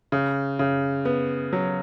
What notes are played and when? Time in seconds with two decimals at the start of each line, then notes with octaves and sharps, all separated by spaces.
0.12 C#3
0.59 C#3
1.05 B3
1.53 F#3